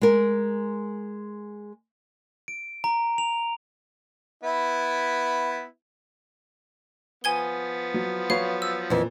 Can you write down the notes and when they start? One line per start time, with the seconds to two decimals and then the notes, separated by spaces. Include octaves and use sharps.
0.02 G#3 A#4
2.48 D7
2.84 A#5
3.18 F7
4.43 B3 E4
7.24 F3 B3 G#5 G#6 G7
7.94 F#3
8.30 F#3 B4 C#5 F5
8.62 E6
8.90 F2 A#2 E3